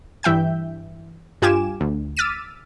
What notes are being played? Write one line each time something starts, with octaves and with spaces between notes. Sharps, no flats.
G2 E3 E5 G5 G6
G2 F4 G4 G#5 D6 E7
D2
D6 E6 F6 A6 B6 D#7